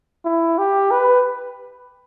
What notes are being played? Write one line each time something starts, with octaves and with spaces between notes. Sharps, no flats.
E4
G4
B4